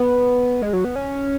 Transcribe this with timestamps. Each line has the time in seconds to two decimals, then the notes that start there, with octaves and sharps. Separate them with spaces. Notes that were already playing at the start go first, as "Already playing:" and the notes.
Already playing: B3
0.62 G#3
0.73 F#3
0.85 B3
0.96 C#4